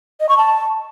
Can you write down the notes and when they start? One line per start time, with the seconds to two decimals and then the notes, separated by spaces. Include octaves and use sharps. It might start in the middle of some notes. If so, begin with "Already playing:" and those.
0.20 D#5
0.29 C#6
0.38 A5